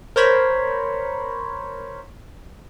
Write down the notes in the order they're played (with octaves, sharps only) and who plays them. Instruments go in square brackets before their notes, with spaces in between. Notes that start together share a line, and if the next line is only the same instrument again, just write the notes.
[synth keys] A#4 C5 C#5 B5